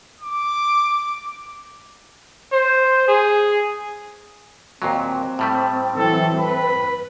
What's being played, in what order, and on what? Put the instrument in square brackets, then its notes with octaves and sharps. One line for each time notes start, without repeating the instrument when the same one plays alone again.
[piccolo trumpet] D6
[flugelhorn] C5
G#4
[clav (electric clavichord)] D#2 A#2 F#3 [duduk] C4
[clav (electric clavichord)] A2 G3 A3
[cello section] E3 F#3 [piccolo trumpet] A4
[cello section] B4 [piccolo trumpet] B5